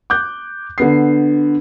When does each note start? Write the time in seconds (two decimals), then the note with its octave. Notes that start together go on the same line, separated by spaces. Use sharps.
0.10 D6 F#6 G6
0.78 D3 B3 C7